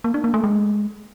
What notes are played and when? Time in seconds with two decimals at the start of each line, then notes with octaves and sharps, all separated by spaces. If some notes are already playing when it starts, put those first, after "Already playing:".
0.04 A#3
0.14 D4
0.24 A#3
0.34 A3
0.44 G#3